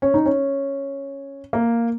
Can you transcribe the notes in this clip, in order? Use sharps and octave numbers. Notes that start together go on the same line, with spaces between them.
C#4
D#4
C#4
A#3